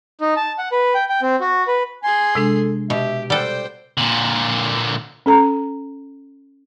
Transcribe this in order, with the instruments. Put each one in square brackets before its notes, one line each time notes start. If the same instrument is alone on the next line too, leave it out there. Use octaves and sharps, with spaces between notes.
[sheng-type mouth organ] D#4
A5
F#5
B4
G5
G5
C4
F#4
B4
[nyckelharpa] G#4 C6 [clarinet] G#5
[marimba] C3 G#3 D4 [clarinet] A4
[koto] B2 [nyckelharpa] G4 [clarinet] E5
[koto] G3 A4 [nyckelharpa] C5 G5 [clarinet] D5 [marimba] F#5 F#6
[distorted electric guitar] A#2 D3
[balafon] C#4 A4 A#5